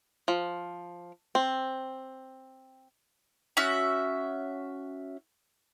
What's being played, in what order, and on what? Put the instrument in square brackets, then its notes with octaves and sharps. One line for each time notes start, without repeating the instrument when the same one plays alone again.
[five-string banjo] F3
C4
[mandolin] C#4 F#4 E5